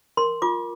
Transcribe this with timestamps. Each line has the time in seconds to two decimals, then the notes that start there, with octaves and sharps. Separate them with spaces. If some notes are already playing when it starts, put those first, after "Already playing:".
0.17 A#4 C6
0.42 F4 D6